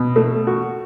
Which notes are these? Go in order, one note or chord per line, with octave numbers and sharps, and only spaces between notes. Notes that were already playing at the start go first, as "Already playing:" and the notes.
Already playing: B2
A3
F#4